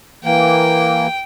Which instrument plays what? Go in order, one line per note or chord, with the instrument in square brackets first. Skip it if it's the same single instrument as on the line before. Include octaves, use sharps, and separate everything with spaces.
[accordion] E3 A#3 [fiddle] G5